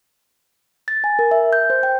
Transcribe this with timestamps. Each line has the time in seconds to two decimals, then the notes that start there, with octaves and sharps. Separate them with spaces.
0.88 A6
1.04 G#5
1.19 A#4
1.31 E5
1.53 G6
1.70 C5
1.83 G5